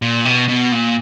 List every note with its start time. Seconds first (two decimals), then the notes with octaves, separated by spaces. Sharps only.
0.02 A#2
0.25 B2
0.49 B2
0.72 A#2